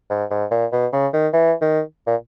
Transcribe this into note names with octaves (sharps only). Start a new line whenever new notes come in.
G#2
G#2
A#2
B2
C#3
D#3
E3
D#3
A#2